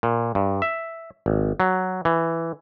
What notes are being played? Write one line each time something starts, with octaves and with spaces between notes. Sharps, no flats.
A#2
G2
E5
G#1
F#3
E3